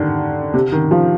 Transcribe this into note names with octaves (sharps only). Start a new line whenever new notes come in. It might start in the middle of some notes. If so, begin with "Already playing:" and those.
Already playing: D3 D#3
C3
D#3
F3